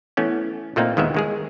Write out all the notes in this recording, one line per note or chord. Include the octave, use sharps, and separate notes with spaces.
E3 A3 B3 C#4
A#2 A3 A#3 C4 D#4
D#2 D#3 G#3 B3 E5
D#3 G#3 G#4